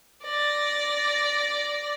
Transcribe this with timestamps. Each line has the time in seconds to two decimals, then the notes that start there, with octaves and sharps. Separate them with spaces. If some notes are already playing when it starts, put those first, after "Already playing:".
0.24 D5 A#6